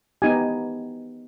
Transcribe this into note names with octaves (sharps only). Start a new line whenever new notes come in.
B3 D#4 G4 G#5